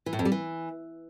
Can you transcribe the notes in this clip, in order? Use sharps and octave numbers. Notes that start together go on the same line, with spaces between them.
E3
A2
F2
G3
E3